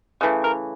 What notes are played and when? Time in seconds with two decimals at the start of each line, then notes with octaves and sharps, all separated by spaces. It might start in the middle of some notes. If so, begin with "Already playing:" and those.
0.21 C#3 E3 A3
0.44 A#4